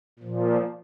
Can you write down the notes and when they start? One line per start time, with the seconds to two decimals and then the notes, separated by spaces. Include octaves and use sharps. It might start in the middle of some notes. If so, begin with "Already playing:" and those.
0.19 A#2 F3